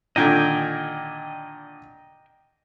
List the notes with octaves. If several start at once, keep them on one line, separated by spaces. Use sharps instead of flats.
A#2 D3 D#3 D#5 G5 G#5